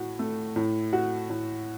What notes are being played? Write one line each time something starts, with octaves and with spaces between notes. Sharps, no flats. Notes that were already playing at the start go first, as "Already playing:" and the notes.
Already playing: A2 F#4
A3
A2
F#4
A2